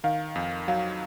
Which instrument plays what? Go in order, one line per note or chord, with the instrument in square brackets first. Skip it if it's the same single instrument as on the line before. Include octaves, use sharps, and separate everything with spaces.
[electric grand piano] D#3 [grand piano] F5
[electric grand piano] F2
[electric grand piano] F#3 [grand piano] F5